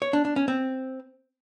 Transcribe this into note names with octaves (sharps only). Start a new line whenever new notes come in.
C#5
D4
D4
C#4
C4